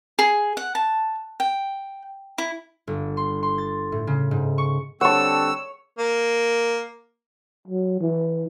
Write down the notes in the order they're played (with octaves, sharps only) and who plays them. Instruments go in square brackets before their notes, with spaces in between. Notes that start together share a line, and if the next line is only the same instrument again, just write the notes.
[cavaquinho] G#4
F#5
A5
G5
E4
[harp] G1
C6
C6
A6
A2
C#3
G#2
C#6
[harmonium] D3 G3 C4 [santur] C#5 C#6 [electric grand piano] F#5 A5 [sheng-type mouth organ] E6
[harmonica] A#3
[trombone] F#3
E3